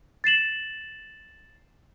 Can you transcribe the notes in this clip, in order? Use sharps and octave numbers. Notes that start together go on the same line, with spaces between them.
A6 C7 E7 F#7